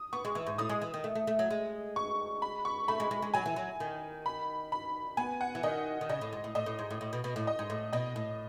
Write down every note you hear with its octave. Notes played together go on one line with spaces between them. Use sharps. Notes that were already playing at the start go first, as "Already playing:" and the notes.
Already playing: D#6
B3 C#6
G#3
E3
G#2
A2 D#6
G#3
E3
D#3
A3
A3
A3
F#3
G#3
C#6
B5
C#6
A3 B5
G#3
G#3
G#3
F#3 G#5
E3
F#3
D#3
B5
B5
B3 G#5
F#5
E3
D#3 D#5
D#3
C#3 D#5
A2
G#2
A2
A2 D#5
A2
G#2
A2
A2
B2
B2
A2
D#5
G#2
A2
B2 D#5
A2